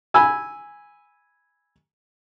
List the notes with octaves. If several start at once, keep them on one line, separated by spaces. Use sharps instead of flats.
G#5 B5 E6